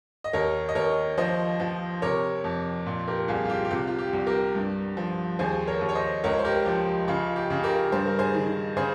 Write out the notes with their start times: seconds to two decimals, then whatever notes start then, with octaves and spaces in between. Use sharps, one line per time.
0.24 D#5
0.33 D#2 A#4 C#5
0.69 D#5
0.75 D#2 A#4 C#5
1.18 F3 C5 D#5
1.60 F3
2.02 C3 A#4 C#5
2.44 F2
2.86 A#2
3.08 G4 A#4
3.28 C2 F4 G#4
3.45 F4
3.49 G4
3.65 G4
3.71 C3 F4
3.88 F4
3.99 G4
4.13 C2
4.26 G4 A#4
4.55 G2
4.97 F3
5.39 D#2 G#4 C5
5.67 A#4 C#5
5.81 D#2
5.89 C#5
5.95 C5 D#5
6.24 C#2 A#4 C#5
6.39 C5
6.45 G4 A#4
6.66 F3 G4
7.08 C#3 F4
7.36 G4
7.50 C#3
7.64 G4 A#4
7.92 G2 C5
8.06 A#4
8.19 G#4 C5
8.34 D#3
8.77 C#3 G#4 C5